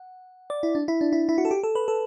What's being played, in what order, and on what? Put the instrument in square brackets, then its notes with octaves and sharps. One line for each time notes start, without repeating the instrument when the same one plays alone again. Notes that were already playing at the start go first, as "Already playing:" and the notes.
Already playing: [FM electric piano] F#5
D5
E4
D4
E4
D4
E4
E4
F#4
A4
G4
A4
B4
A4